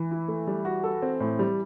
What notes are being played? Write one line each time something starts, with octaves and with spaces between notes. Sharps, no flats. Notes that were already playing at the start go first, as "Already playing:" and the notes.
Already playing: E3
E4
A3
G3
F#4
A4
C4
A2
G3